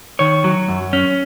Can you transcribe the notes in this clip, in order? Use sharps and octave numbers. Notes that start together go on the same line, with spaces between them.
D#3 C#5
F#3
F#2
C#4